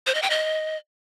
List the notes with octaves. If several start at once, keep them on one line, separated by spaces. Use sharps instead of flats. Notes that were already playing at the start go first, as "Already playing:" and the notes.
C5
D#5
G5
D#5